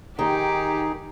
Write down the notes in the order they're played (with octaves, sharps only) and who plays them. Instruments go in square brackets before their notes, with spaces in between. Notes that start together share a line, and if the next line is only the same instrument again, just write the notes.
[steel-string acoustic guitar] D#3 [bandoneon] D#4 G#4 [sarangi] G4